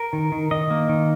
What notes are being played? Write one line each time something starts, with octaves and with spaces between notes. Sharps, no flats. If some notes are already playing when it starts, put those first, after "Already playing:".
Already playing: A#4
D#3
D#3
D#3 D#5
A#3
D#3